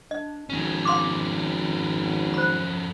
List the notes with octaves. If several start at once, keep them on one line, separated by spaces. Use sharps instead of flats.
D4 D#5
G#1 F2 C4 C#4
F5 C6 D6
F#3 C5 B5